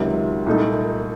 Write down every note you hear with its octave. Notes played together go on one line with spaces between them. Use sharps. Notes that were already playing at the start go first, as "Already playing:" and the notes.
Already playing: C#2 C3 D#3 F#3
C2 A#2 A3 D#4 A4